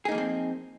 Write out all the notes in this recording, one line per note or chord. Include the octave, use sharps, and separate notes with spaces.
F3 A#3 C4 D#4 G#4